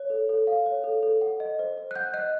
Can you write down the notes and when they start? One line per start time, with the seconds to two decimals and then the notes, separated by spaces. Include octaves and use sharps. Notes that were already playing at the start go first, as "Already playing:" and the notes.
Already playing: C#5
0.10 A4
0.29 A4
0.47 F5
0.66 C#5
0.84 A4
1.03 A4
1.21 F#5
1.40 D#5
1.59 C5
1.78 C5
1.91 F#6
1.96 F#5 G6
2.14 D#5 F#6